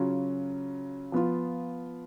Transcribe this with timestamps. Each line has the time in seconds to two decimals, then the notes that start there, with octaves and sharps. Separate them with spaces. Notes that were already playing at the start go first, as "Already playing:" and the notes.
Already playing: C#3 F#3 C#4 F4
1.12 F3 B3 F4